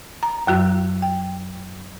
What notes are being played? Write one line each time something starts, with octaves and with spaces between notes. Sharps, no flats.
A#5
F#2 F#3 F#4
G5